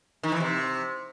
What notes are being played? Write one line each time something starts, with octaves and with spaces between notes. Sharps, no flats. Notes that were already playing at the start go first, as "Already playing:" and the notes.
D#3
E3
C3